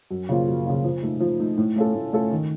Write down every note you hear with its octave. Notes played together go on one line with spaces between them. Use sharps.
F#2
C#3 F3 A#3 F4
F#2
C#3 F3 A#3 F4
F3
A3 D#4
F3
A3 D#4
A2
A3 C#4 F4 A4
A2
A3 C#4 F4 A4
D#3